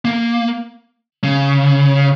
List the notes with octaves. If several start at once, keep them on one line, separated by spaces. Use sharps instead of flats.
A#3
C#3